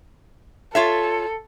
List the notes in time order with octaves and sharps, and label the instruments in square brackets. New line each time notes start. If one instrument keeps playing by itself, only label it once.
[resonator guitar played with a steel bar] F4 C#5 E5 [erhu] A4